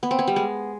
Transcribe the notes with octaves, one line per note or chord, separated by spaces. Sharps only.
B3
C4
B3
G3
G#3